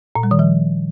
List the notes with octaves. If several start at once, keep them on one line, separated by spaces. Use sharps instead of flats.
A#2
G3
D#3
F3